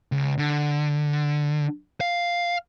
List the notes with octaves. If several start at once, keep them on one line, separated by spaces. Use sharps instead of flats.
C#2
D3
F5